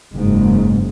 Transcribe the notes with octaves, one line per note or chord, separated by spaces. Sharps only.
F#1 G#2